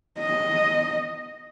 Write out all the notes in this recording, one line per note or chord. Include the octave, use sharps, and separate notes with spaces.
D#5